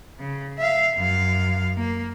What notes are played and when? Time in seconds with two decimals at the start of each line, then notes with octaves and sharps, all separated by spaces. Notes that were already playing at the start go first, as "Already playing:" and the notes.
0.19 C#3
0.58 E5 F5
0.96 F#2 F5
1.77 A#3